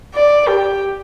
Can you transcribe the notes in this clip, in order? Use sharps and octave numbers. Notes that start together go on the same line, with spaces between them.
D5
G4